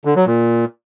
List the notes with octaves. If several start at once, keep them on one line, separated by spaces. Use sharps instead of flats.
D3
F#3
A#2